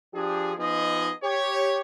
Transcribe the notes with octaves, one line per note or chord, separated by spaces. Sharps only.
F3 D4 G4 G#4
F3 B3 D#4 G#4 D#5
G4 C#5